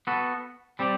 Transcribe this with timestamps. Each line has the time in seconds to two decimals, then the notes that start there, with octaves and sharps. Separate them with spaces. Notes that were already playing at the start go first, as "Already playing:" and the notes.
0.07 B3 F#4 A4
0.79 G3 C4 G4 D5